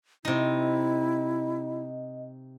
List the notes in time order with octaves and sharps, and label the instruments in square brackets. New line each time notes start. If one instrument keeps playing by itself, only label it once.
[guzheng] C3 D#4 [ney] E4 [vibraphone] D#5